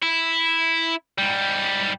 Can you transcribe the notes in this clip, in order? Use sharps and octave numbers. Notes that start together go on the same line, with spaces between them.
E4
G#2 G3